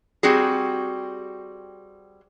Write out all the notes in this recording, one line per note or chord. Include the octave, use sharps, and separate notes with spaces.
G3 C4 F#4 G#4